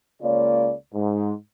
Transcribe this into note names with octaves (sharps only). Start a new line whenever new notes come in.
C#2 C#3 A#3 F4 C#5 D5
G#2